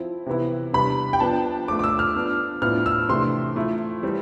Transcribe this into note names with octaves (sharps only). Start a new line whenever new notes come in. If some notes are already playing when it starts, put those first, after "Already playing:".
Already playing: F3 C4 E4
C3 E3 B3 E4
C3 G3 B3 D4 B5
G5
F3 B3 D4 A5
F3 A3 D4 D6
D6
E6
F6
F3 B3 D4
A2 F3 B3 D4 F6
E6
C3 E3 A3 D4 C6
F3 A3 E4
E3 G3 C4